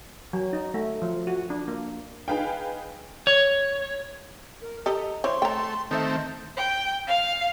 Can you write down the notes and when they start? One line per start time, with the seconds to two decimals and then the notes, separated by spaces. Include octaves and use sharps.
0.33 F#3
0.53 D#4
0.74 A3
1.02 F3
1.27 F#4
1.50 D4
1.68 A#3
2.28 D#4 G#4 B4 F5 G5
3.27 C#5
4.62 A#4
4.86 G4 A4 D#5 A#5
5.24 E3 C4 C#5 C6
5.42 A3 G5 A#5
5.91 D#3 A3 B3 C4 A4 E5 G6
6.56 G5
7.07 F5